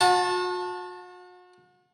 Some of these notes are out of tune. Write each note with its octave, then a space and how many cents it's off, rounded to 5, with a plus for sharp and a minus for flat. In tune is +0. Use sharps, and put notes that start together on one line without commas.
F#4 -40 A5 +0